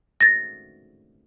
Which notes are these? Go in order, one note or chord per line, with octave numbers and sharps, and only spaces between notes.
A6 A#6